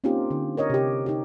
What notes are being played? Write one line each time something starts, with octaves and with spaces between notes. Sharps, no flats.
A#3 C4 C#4 D#4 F4 G4
D3
A#4 C#5 D#5
C3 G4
D#4 G4